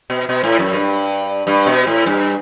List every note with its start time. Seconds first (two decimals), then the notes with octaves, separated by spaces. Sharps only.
0.10 B2
0.29 B2
0.44 A2
0.59 F#2
0.73 G2
1.47 G2
1.66 B2
1.87 A2
2.06 G2